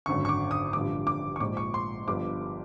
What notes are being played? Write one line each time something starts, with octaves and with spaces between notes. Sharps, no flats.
G#1 F#2 D3 C#6
C#6
D6
D#6
A1 G2 D3 F3 D6
D6
C#6
A#1 G#2 F3 D6
C#6
C6
G1 G2 D3 F3 D6